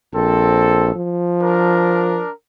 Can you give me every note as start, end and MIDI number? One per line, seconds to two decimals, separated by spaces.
0.14 0.91 34
0.14 0.93 60
0.14 0.93 69
0.95 2.21 53
1.41 2.30 62
1.41 2.30 70